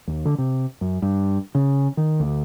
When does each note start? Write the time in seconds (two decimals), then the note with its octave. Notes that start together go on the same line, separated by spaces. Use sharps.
0.08 D#2
0.25 D3
0.38 C3
0.81 F#2
1.02 G2
1.55 C#3
1.97 D#3
2.20 D2